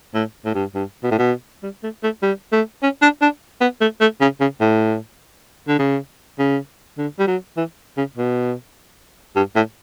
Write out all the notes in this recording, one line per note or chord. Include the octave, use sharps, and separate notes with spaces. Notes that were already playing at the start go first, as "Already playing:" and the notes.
A2
A2
G2
G2
B2
A2
B2
G3
A3
A3
G3
A3
C#4
D4
D4
B3
A3
A3
C#3
C#3
A2
D3
C#3
C#3
D3
G3
F#3
E3
C#3
B2
G2
A2